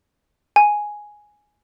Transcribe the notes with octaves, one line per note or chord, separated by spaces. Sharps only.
G#5